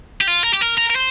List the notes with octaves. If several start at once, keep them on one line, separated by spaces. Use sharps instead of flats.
G4
F4
A#4
G4
A#4
A#4
A#4
C5